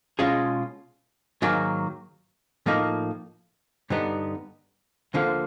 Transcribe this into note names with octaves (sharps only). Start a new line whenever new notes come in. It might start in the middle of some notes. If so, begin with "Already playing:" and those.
B2 G#3 C#4 F4 G#4
G#2 D#3 F#3 A#3
A2 F3 A#3 D#4
G2 D3 G3 B3 D#4
D2 D3 F3 A#3